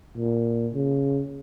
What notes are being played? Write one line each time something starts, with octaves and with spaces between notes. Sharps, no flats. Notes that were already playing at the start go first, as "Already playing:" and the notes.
A#2
C#3